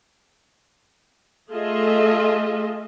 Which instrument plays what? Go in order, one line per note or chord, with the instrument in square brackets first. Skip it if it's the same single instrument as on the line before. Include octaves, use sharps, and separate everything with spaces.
[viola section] A3 F4 G#4 A4 D#5 E5